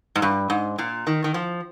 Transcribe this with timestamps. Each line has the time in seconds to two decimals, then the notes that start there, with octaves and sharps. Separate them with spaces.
0.16 G#2
0.22 G2
0.50 G#2
0.78 A#2
1.07 D#3
1.24 D#3
1.34 F3